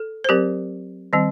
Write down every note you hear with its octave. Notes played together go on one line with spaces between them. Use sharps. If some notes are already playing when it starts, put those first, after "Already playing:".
Already playing: A4
C5
F#3 C4 G4 A#4
D#3 G3 C4